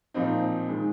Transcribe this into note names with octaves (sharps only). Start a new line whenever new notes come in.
A#2 F3 C4 D#4
D#3 G#3